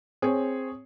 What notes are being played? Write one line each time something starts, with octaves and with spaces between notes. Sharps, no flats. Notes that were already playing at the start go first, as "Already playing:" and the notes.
C4 G#4 C#5